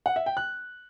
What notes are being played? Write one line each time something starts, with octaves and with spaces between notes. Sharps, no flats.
F#5
E5
G5
F#6